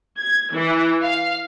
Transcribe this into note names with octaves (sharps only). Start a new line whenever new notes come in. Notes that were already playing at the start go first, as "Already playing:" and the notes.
G#6
E3
F5